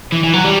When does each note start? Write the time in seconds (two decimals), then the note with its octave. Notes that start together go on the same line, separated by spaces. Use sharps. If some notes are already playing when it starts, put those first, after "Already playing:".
0.12 E3
0.24 E3
0.33 F#3
0.44 G3